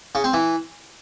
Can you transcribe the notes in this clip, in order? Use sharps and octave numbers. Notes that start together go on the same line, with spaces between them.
C#3
C4
E3